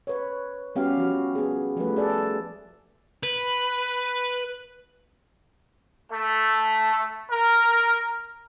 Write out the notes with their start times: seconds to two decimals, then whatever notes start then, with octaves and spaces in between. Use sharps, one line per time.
0.07 B4 C#5
0.75 G3 B3 C#4 F#4 G4 F5
0.97 F3 F#4
1.35 B3 G#4
1.77 F3 G3 A3 B4
1.96 G#4 A4 D5
3.23 B4
6.10 A3
7.29 A#4